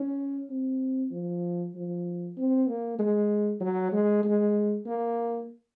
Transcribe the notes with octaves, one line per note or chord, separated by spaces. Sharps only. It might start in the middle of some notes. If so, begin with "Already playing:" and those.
Already playing: C#4
C4
F3
F3
C4
A#3
G#3
F#3
G#3
G#3
A#3